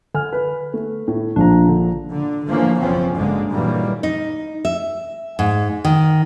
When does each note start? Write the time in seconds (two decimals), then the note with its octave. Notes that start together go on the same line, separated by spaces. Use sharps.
0.15 D3 G#5 F6
0.33 B4
0.74 A3
1.08 A2
1.36 A#1 F3 D4 A#5
1.69 D3
2.11 D3
2.46 D3 E3 F3 A#3 C#4
2.78 F#1 B1 E2 F3 C4 C#4
3.15 F#1 B1 G2 D3 G#3 A#3
3.52 A#2 D#3 E3 F#3 G3 A#3
4.03 D#4
4.65 E5
5.39 G#2
5.85 D#3